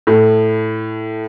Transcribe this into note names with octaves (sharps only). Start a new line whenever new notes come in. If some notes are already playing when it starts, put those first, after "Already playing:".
A2